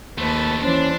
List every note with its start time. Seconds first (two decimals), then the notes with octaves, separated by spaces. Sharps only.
0.18 D#2 F3 A3 B4 A5 A6
0.63 E3 C#4 D4 C5